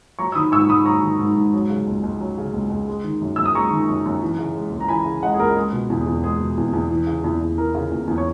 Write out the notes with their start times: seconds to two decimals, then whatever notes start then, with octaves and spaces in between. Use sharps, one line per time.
0.19 F#3 A#5 C#6
0.32 E6
0.35 D#3 B5 D#6
0.52 G#2 C#6 E6
0.69 G#2 B5 D#6
0.85 F#3 A#5 C#6
1.02 D#3
1.19 G#2
1.36 G#2
1.54 F#3
1.70 C#3
1.87 C#2
2.03 C#2
2.21 F#3
2.38 C#3
2.53 C#2
2.70 C#2
2.88 G#3
3.04 D#3
3.21 F#2
3.36 F#2 E6
3.46 D#6
3.55 G#3 A#5 C#6
3.71 D#3
3.89 F#2
4.06 F#2
4.22 E3
4.39 C#3
4.56 G#3
4.72 C#2
4.81 A#5
4.88 E3 G#5 B5
5.06 C#3
5.23 G#3 D#5 F#5
5.34 G#4
5.39 C#2 A#4
5.56 G#3 G#4
5.73 B2
5.90 E2
6.00 G#4
6.07 E2
6.24 G#3 G#4
6.40 B2
6.58 E2
6.73 E2
6.91 E3
7.07 C#3
7.24 E2
7.41 E2
7.57 E3 A#4
7.75 C#3
7.92 E2
8.08 E2
8.18 C#5